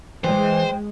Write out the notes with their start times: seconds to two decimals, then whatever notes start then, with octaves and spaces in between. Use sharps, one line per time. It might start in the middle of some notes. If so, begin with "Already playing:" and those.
0.24 E3 G#3 C5 G5